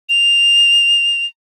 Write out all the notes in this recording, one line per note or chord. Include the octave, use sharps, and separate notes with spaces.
F7